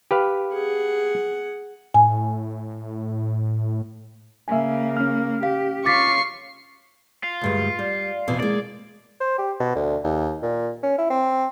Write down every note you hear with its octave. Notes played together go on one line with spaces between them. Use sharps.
G4 B4 F5
G#4 F#5
A2 G#5
C#3 A#3 E5 G#5
C#4 F6
G4 F5
F4 C#5 C#6 D6 A6 B6 C7
F4
D2 G2 G#3
G3
F2 B2 E3
G#3 A#3 D5
C5
G4
B2
D2
D#2
A#2
C#4
E4
C4